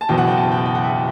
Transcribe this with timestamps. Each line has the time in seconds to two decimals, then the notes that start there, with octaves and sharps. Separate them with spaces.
0.01 A5
0.09 F#1 E2 B2 G5
0.18 F#5
0.28 G5
0.37 A5
0.52 G5
0.66 G5
0.75 F#5
0.84 E5